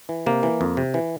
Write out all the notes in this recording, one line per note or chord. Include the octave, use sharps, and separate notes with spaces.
E3
C3 A#3
E3
F2
C3
E3